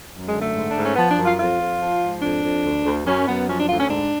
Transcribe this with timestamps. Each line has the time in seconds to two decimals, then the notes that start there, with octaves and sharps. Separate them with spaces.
0.13 F#2
0.26 G#3
0.33 D3
0.40 A3
0.54 G#2
0.71 G#2 D4
0.84 C#4
0.96 F3 B3
1.10 D4
1.17 F#2
1.24 F4
1.38 F2 F4
1.59 F2
1.80 F3
2.01 G#2
2.22 F2 D4
2.43 F2
2.64 D2
2.85 D2
3.06 F#2 C#4
3.27 F#2 B3
3.48 F3 C#4
3.58 D4
3.68 D2 F4
3.80 C#4
3.89 G#2 D4